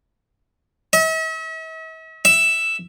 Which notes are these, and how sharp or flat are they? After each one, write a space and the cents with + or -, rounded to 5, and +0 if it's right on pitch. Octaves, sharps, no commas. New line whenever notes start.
E5 -45
E5 +5